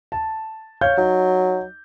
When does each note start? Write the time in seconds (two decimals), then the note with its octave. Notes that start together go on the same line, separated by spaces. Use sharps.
0.12 A5
0.81 C#5 F5 G6
0.98 F#3 D#4